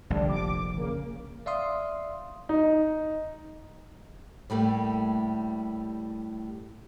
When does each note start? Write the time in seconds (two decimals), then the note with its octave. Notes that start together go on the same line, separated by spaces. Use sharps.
0.10 F1 A#1 F2 D3 G3 D4
0.29 D6
0.76 C#3 A#3
1.46 D5 E5 F5 C6 D#6
2.49 D#4
4.50 A2 G3 A3 A#3